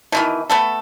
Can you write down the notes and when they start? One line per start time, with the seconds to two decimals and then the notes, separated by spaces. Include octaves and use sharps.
0.12 B2 D#3 E3
0.50 A3 B3 A4